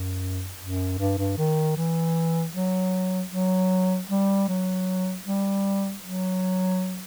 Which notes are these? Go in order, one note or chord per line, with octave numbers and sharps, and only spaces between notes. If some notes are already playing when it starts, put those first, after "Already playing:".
Already playing: F#2
F#2
G2
G2
D#3
E3
F#3
F#3
G3
F#3
G3
F#3